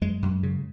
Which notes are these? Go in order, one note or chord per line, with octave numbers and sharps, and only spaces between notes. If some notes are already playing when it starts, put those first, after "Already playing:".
F#2 G#3
F#2
C#3